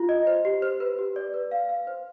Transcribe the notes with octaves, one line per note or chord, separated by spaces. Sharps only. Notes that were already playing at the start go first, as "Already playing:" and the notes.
Already playing: F4
D#5
C5
G4
C5
B4
G4
D5
B4
F5
F5
C5